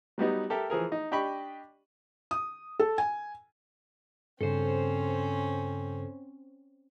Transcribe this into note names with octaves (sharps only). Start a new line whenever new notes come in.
F#3 G3 B3 D#4
G4 A4 A#4 E5
E3 F3 G#4 A#4
D#4
D4 G4 D#5 G5 B5 C#6
D#6
A4
G#5
G2 C#3 C4 C#4 A4 C5